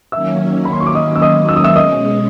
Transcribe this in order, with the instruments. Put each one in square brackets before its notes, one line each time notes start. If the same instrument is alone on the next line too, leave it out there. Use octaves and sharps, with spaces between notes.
[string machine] D#3 F#3 A#3 C#4 [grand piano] E5 E6
[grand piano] B5
C6
C#6
D6
D#5 D#6
E6
D#5 D#6
E6
D#6
E5 E6
[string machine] B2 G#3 C#4 [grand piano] D#5 D#6